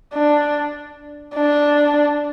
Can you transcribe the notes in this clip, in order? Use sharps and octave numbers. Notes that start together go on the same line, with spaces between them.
D4
D4